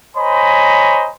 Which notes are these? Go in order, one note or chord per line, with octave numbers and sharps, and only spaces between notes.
C5 C#5 D#5 G#5 A#5 B5